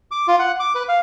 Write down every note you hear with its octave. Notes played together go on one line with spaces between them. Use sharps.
D6
F4
F#5
D6
B4
F5